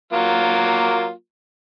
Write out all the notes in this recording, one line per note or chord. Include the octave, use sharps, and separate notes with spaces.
F#3 A#3 F4